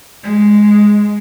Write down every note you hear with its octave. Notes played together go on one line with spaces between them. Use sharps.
G#3